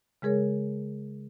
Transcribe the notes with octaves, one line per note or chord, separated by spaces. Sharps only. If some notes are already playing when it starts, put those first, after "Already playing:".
C#3 G#3 G#4 A#4 C#5